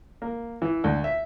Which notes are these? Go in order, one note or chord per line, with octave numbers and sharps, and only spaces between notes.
A#3
E3
D2
E5